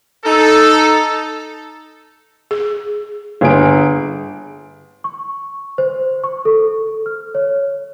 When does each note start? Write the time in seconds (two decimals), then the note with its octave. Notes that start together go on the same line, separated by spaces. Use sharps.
0.25 D#4 A4
2.51 G#4
3.41 G1 G#4 D7
5.04 C#6
5.78 C5
6.24 C#6
6.45 A4
7.06 F6
7.35 C#5